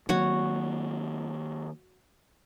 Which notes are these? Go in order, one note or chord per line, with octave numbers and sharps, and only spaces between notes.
D#3 F#3 A#3 F#4 C#5